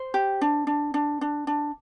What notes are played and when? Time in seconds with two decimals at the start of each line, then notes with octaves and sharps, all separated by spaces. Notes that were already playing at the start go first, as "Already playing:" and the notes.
Already playing: C5
0.14 G4
0.41 D4
0.67 D4
0.94 D4
1.21 D4
1.47 D4